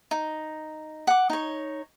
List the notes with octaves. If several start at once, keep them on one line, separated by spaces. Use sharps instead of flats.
D#4
F#5 D6
D#4 C#5